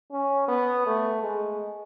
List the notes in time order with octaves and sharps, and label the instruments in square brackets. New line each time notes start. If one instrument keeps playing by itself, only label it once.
[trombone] C#4
B3
A3
G#3